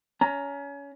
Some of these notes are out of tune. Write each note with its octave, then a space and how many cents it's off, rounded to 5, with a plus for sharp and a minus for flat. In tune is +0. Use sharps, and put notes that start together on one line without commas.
C#4 +25 A#5 +0